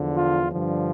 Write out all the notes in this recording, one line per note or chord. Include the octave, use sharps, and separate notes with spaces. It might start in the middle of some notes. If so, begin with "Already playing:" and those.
Already playing: E2 D3 F3
F4
G2 D3 F3